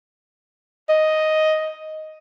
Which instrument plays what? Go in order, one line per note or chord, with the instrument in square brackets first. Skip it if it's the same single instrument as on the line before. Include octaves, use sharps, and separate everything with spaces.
[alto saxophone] D#5